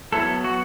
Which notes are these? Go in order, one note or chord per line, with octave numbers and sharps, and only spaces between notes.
F#3 B3 E4 A4
F#4